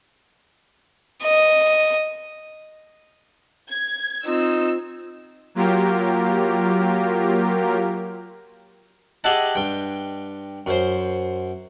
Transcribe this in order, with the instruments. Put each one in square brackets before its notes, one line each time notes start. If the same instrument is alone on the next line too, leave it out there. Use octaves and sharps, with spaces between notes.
[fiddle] D#5
[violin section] G#6
[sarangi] C4 [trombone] D#4 [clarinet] F4 [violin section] E6
[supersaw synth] F#3 A#3 F4 G4 A#4
[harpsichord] G4 G#4 D#5 E5 F#5 A5
G2 G5
F#2 C5